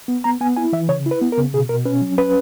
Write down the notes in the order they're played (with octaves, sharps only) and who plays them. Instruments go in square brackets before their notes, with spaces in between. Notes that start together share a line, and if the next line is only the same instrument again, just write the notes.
[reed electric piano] B3
B3 A#5
B3 G#5
E4 G#5
E3 E5
C#3 C#5
E4
B4
B3
A#4
C#3
B2 G#4
B2 A#4
C#4 B4
F#3
C#4 B4